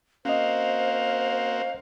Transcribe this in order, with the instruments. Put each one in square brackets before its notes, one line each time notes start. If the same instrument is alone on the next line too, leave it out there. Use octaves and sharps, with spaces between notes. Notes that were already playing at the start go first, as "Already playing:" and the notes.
[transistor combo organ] A#3 C4 F#4 [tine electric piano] C#4 D#5 [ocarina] C5 [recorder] F5